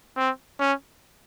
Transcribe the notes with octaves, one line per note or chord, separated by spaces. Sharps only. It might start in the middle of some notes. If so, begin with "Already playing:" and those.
C4
C#4